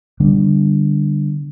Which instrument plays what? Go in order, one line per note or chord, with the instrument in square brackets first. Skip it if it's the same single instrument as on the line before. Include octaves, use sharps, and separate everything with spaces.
[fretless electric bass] D3 G3 B3 D4